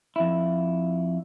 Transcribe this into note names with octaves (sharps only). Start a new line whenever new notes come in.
F2 E4